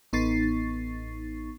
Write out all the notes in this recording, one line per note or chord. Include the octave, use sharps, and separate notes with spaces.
A1 B3 D#4 C#6 A6 C7